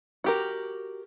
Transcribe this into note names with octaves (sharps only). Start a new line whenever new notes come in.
F#4 G4 A#4